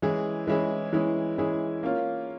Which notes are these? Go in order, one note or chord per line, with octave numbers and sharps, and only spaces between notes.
E3 G#3 C#4 E4 G#4
E3 G#3 C#4 E4 G#4
E3 G#3 C#4 E4 G#4
E3 G#3 C#4 E4 G#4
A#3 C#4 F4